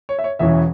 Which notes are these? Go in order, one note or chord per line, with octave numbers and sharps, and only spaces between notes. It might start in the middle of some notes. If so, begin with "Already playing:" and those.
C#5
E5
C#5
E1 E2 E3 C#4 E5